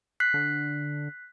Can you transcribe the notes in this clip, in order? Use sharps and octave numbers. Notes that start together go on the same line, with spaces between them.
F#6 B6 C7
D3